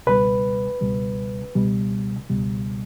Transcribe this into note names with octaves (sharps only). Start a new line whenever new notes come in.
C#2 B2 G3 B4
C#2 B2 G3
C#2 B2 G3
C#2 B2 G3